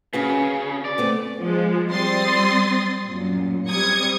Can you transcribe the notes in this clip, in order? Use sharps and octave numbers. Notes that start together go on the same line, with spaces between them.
C#3 C#4 F#4 B4
D5
A3 B3 C4
F3 G#3
G3 C4 C6 D#6 A6
F#2 A#2
G3 C4 D#6 G#6 C#7